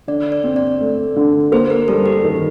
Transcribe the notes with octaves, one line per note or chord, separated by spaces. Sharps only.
D3 D5
D5
C4
D5
A3
D3
A#3 C5
A#4
G3 A4
G4
D#3